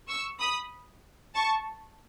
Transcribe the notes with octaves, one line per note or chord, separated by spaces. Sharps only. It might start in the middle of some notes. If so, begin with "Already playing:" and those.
C#6 E6
B5 D#6
A5 C#6